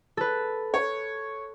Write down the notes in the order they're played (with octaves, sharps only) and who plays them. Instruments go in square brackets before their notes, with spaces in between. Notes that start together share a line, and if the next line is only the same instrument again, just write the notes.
[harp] A4 B4
[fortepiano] C#5